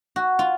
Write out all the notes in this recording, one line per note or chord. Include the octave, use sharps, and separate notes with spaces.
F#4
F4